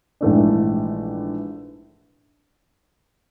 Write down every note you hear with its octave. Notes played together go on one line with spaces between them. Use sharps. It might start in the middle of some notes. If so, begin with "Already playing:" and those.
A#1 G#2 E3 A3 D4